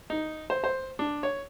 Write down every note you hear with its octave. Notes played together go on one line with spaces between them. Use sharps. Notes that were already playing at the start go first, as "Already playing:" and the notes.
D#4
C5
C5
D4
C#5